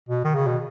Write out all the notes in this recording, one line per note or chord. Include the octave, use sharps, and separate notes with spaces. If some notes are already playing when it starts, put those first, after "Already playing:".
B2
D#3
C#3
B2